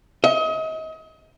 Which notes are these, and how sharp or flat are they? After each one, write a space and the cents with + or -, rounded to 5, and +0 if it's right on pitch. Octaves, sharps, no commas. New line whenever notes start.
D#5 +35